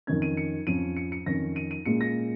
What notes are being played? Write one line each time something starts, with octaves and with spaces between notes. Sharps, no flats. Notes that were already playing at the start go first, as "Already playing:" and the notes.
F2 D#3 C#4 G#6
D#7
C#7
F2 F3 C#4 D#7
C#7
C#7
F2 D#3 C#4 A#6
D#7
D#7
A#2 G#3 C#4 C#7
A#6